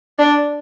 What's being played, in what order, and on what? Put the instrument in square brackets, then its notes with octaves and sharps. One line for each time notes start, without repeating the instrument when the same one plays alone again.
[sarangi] D4